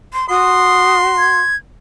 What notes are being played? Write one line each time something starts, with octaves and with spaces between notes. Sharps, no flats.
C6
F#4 C6 D#6
G#6